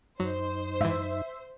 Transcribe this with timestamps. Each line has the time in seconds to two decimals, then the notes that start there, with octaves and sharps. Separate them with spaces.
0.20 F#2 F#3 D#4 C5
0.81 G#2 E3 E5